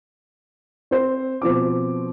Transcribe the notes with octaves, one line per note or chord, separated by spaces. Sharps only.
C4 C5
B2 F3 C4 D6